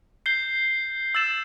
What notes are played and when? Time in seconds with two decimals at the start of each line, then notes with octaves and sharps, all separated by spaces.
0.26 G6 C7 G7
1.15 E6 A6 E7